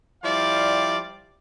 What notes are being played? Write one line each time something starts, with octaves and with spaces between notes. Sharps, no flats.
F3 G3 E4 D5 F5